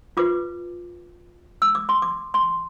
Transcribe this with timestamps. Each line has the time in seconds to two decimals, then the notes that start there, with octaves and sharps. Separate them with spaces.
0.17 F4 B4 D6
1.62 E6
1.75 D6
1.89 C6
2.02 D6
2.34 C6